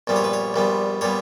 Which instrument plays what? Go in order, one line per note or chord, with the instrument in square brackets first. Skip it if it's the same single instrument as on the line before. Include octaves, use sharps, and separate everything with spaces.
[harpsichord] A#1 A#2 G3 B3
C#5
B4
C#5
A#1 A#2 G3 B3
A#2 G3 B3 C#5